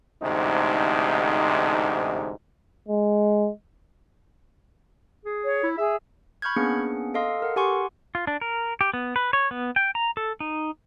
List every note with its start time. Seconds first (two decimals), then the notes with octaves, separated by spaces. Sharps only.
0.22 A1 D2 G#2 C3 D#4
2.89 G#3
5.25 G#4
5.44 C#5
5.63 E4
5.78 G#4 E5
6.42 B5 C#6 F6 G6 G#6
6.56 A#3 B3 C#4 D4 G#4 C#7
7.14 A4 D#5 F5 C6 D#6
7.40 A4 A#4 F#5
7.56 G4 F#5 G#5 C6 C#6
8.15 F4
8.27 D4
8.41 A#4
8.81 G4
8.94 B3
9.16 B4
9.33 C#5
9.51 B3
9.76 G5
9.95 A#5
10.17 A4
10.40 D#4